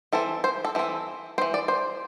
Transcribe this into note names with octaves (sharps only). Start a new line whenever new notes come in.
E3 C4 A4
C5
A4
E3 C4 A4
C4 C5
E3
D5
C5